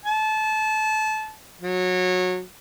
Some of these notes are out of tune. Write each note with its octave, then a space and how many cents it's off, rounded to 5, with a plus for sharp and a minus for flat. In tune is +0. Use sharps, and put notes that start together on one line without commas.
A5 -25
F#3 -20